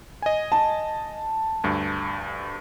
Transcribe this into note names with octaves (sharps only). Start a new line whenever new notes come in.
D#5 G#5
A5
D2 G2